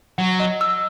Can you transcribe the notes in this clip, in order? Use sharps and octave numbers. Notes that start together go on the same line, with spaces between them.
F#3 F#5
D#5
E6